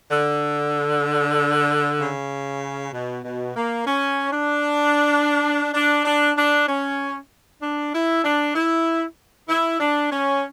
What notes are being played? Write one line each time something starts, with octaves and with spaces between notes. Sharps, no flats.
D3
C#3
B2
B2
A#3
C#4
D4
D4
D4
D4
C#4
D4
E4
D4
E4
E4
D4
C#4